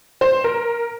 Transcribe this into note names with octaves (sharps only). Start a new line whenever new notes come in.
C5
A#4